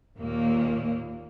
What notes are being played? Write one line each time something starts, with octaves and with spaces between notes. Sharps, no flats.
D#2 A#2 A#3